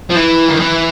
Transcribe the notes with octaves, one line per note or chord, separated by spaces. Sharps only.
F3
E3
D#3
E3